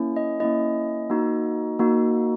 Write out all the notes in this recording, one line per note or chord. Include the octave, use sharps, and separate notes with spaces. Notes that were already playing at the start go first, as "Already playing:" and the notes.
Already playing: A#3 C#4 E4
D#5
A#3 C#4 E4 D#5
A#3 D#4 F#4
A#3 D#4 F#4